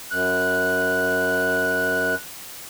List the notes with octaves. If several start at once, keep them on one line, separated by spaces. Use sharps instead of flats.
F#2 F#6